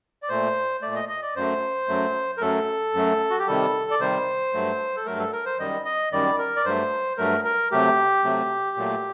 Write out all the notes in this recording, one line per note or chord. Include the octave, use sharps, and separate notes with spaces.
D5
A#2 A3 C5
A#2 A3 D5
D#5
D#5
D5
F#2 F#3 A3 C5
F#2 F#3 A3
A#4
F#2 F#3 A3 A4
F#2 F#3 A3
F#4
G4
C3 D#3 G3 A4
D5
C3 D#3 G3 C5
G2 F#3 A3
A4
G2 F#3 A3 A#4
A4
A#4
C5
F#2 D#3 G3 D#5
D#5
F#2 D#3 G3 D5
A#4
D5
G2 F#3 A3 C5
G2 F#3 A3 A#4
A#4
C3 F#3 A3 G4
C3 F#3 A3
A#2 F#3 A3